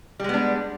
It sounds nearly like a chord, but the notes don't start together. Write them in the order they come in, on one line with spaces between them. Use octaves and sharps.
G3 G#3 B3 D4